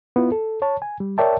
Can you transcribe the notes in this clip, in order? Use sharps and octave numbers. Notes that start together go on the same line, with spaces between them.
B3 E4 F4
A4
C#5 A5
G#5
G3
A#4 C#5 D5 E5 G5 A5